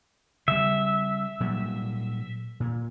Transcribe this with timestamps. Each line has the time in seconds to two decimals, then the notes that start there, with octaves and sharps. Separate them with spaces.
0.48 C#3 G3 E5
1.40 A#2 F#3 G3
2.60 A#2